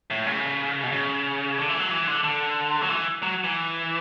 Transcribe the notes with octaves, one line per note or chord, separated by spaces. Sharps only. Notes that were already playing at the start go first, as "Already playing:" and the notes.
A2
C#3
B2
C#3
D3
E3
F#3
E3
D3
D3
F#3
E3
F#3
E3